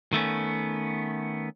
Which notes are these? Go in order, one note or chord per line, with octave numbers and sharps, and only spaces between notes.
D#3 A3 B3 C#4